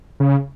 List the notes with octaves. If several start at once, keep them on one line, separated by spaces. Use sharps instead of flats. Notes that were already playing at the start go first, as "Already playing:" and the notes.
C#3